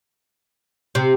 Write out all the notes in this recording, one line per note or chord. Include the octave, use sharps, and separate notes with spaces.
C3